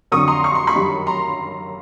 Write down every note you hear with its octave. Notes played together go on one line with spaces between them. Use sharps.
F2 D3 F#3 C#6 D#6
A#5 C6
C#6
C6
B5 C#6
F#2 D#3 G3
A#5 C6